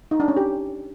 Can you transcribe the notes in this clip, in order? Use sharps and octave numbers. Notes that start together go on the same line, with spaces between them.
D#4
D4
C#4
G4